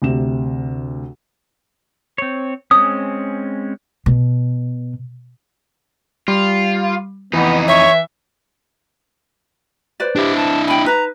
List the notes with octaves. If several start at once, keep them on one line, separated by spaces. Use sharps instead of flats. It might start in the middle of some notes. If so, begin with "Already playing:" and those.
D2 C3 E7
C4 C#5
G#3 C4 C#4 D#6
B2
G3 F4
F2 E3 B3 D#4
C#5 E5
B4 C5 D5
D4 E4 G4
A5
G5 G#5 B5
D#4 B4 A#5